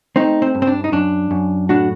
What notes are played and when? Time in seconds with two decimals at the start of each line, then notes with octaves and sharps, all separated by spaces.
0.16 A3 C4 D#4
0.42 C4
0.55 G2
0.62 C4
0.67 D4
0.84 D#4
0.92 F#2 D4
1.31 F#2
1.69 A2 D4 F#4